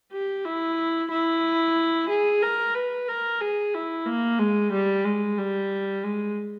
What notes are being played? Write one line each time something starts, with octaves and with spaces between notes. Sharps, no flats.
G4
E4
E4
G#4
A#4
B4
A#4
G#4
E4
A#3
G#3
G3
G#3
G3
G#3